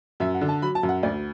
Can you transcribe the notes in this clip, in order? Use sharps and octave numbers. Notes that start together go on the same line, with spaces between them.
F#2 E5
F#5
D3
A5
F#3 B5
A5
F#2
F#5
D2 D5